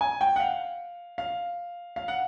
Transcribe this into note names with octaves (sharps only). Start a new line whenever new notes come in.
G#5
G5
F#5
F5
F5
F5
F#5